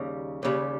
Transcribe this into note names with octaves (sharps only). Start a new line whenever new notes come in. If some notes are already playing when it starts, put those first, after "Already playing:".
Already playing: D#2 C#3 G3
D#2 C#3 G3